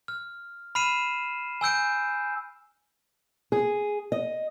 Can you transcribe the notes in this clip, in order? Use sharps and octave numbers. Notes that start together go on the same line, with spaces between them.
F6
B5 F6 C7 D#7 E7
G#5 E6 G6 D7
G#4
D#5